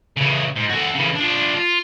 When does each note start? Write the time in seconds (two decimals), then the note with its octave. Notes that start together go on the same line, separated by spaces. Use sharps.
0.17 C#3 E3
0.56 G#2
0.70 F#4 A4
0.95 C#3 E3
1.15 D4 F4
1.55 F4